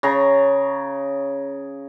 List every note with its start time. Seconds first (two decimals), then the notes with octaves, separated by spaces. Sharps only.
0.03 C#3 A#5